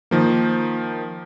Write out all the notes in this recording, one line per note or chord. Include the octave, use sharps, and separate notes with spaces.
D#3 F3 A#3